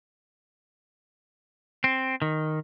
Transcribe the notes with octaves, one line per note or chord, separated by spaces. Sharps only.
C4
D#3